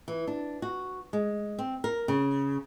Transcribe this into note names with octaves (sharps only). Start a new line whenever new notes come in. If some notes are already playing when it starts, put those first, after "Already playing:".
E3
D4
F#4
G#3
C4
A#4
C#3